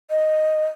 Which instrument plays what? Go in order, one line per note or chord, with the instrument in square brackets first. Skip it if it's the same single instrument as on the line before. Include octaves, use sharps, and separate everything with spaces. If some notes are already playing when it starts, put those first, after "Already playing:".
[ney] D#5